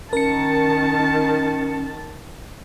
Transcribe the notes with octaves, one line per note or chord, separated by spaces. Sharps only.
D#3 C#4 A#4 A5 C#7